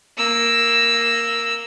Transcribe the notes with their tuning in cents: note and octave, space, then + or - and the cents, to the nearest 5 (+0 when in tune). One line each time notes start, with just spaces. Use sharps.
A#3 +0 E6 +0